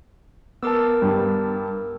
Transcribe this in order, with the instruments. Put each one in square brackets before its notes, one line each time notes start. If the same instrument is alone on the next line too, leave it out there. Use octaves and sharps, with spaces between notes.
[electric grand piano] B3 A5 [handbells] A#4 D6 E6
[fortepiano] G2